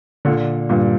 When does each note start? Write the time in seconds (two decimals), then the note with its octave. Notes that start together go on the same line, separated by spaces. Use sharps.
0.25 A#2 D3
0.69 G2 A#2